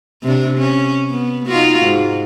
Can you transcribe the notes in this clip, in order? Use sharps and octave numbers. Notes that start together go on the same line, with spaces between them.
C3 D4
C#4
B3
D#4 F4 F#4
G#2